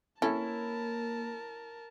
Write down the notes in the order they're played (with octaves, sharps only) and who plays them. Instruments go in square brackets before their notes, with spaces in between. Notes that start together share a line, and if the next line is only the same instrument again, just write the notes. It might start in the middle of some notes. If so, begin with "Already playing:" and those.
[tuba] A#3 [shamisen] C#4 A4 [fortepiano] E4 [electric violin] A#4 A5